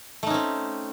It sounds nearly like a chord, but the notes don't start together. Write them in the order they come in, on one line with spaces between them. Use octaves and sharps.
A3 D#4 C#4 C4